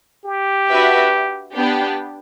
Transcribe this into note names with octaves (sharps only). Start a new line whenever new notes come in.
G4
D4 F#4 B4 E5
B3 D4 G4